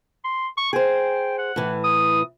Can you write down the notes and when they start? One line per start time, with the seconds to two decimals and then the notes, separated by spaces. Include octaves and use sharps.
0.24 C6
0.57 C#6
0.73 G#4 C5 G5
1.38 F#5
1.56 A2 E3
1.84 D#6